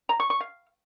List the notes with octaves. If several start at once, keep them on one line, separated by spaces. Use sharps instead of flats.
A#5
C#6
C#6
F5